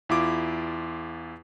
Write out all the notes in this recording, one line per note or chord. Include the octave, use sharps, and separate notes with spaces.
E2 E4 F4 D6